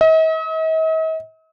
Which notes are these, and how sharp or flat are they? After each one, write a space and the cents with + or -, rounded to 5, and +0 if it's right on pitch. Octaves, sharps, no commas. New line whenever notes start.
D#5 +45